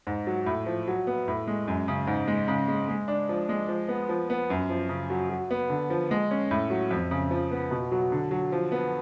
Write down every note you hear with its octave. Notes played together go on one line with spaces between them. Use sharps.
G#2
F#3
A2
F3
F#3
B3
A2
G#3
F#2
C#3
G#2
G#3
C#3
G#3
G#3
D4
F3
G#3
F3
B3
F3
B3
F#2
F3
C#3
F#3
F#3
B3
D3
F3
G#3
C#4
A2
F#3
F2
C#3
F3
B3
B2
F#3
D3
F#3
F3
B3